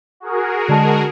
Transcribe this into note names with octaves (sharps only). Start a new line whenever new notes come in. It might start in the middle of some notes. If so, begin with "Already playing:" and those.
F#4 G#4 A#4
D3 G#3 A5